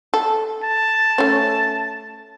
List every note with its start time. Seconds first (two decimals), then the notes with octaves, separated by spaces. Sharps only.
0.14 A4
0.64 A5
1.18 A3 C#4